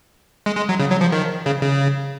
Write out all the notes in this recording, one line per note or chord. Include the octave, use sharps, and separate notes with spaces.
G#3
G#3
F#3
C#3
F#3
F3
D#3
C#3
C#3